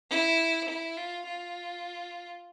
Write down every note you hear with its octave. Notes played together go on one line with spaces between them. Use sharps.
E4
E4
F4
F4